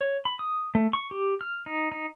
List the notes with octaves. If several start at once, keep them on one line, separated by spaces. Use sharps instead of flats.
C#5
B5
D#6
A3
C#6
G4
F6
D#4
D#4